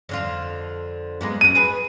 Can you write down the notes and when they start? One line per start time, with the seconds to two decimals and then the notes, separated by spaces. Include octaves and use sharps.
0.09 F2 D3 F4
1.21 G#3 A#3 B3
1.41 F#2 F#4 D#7
1.55 G#4 B4